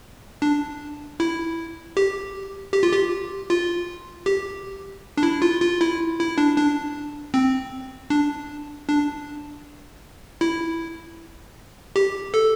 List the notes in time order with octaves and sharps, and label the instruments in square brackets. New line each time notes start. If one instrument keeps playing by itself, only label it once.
[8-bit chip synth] D4
E4
G4
G4
F4
G4
F4
G4
D4
E4
F4
F4
E4
E4
D4
D4
C4
D4
D4
E4
G4
A4